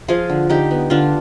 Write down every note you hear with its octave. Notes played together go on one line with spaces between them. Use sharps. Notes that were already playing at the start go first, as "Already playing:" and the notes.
F3 F4 G#4
D3
D3 D#4 G4
B3
D3 D4 F4